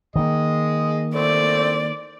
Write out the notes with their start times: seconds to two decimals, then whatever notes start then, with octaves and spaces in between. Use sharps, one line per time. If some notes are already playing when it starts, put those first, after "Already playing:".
0.16 D#3 A#3 G#4 D#5
1.15 A3 C4 D5